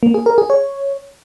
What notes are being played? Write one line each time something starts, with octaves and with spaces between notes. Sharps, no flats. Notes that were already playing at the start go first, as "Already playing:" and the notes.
A#3
G#4
A#4
G#4
C#5